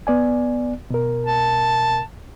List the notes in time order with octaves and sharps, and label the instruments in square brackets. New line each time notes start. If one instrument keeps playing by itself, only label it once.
[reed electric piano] B3 D5 G#5
B2 A#4
[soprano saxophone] A5